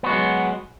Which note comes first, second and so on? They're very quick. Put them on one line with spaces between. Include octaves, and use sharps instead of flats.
B3 F#4 G#3 F#3